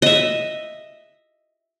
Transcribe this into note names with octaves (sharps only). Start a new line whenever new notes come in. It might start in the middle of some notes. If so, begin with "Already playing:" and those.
D#5 E5